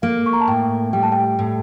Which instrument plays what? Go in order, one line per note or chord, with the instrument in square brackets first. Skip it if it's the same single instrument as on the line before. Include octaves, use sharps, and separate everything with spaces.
[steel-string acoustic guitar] A#3 [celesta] F5
[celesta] C#6
A#5
A5
[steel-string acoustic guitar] A2 [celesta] G5
[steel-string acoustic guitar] G3 [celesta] G5
[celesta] A5
G5
G5
[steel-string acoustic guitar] A2